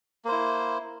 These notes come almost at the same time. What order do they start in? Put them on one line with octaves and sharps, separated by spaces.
A#3 C5 E4